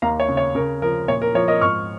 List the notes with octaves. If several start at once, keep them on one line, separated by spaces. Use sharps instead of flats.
D#2 F5 A#5
C#5
C#3
C#5
C#3 A#4
F3 A#4
A#2 C#5
A#4
F3 C#5
A#4 D#5
G#2 C#6 F6